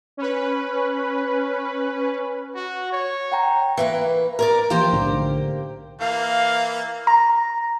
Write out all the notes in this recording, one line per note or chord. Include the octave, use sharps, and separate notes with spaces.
C#4 B4
F#4
C#5
F#5 G5 A#5
E3 A#3 B4
A#4 C#5 D5
E3 F3 A#3 G4 C5
B1 A2 D3
E3 A#3 F5
A#5